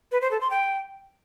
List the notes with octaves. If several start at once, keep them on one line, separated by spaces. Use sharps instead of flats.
B4
C5
A4
C6
G5